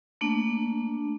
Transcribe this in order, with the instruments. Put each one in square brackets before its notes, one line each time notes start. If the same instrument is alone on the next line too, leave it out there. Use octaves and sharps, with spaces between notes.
[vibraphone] A3 A#3 D4